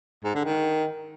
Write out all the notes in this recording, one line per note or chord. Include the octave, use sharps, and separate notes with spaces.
G#2
D3
D#3